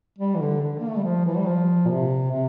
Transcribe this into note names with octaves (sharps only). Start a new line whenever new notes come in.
G3
E3
D3
D3
A#3
A3
G3
F3
E3
G3
F3
A#2
C3
C3